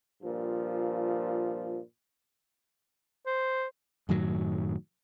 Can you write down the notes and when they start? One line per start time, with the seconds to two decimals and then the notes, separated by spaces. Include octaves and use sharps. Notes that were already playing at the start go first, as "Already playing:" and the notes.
0.22 G2 A#2 F3
3.26 C5
4.09 F#2 A2 D#3 F#3